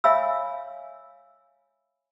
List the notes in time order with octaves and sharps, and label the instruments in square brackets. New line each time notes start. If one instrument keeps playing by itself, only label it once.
[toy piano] C#5 E5 F5 G#5 B5 E6